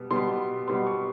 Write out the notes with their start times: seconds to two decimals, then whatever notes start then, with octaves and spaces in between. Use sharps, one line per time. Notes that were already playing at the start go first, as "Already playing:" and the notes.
Already playing: B2 G3 B3
0.11 B2 G3 B3 C6
0.68 B2 G3 B3 C6
0.87 C#6